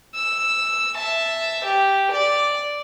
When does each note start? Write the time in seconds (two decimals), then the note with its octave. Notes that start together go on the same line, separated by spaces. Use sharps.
0.15 E6
0.96 E5 A5
1.65 G4
2.13 D5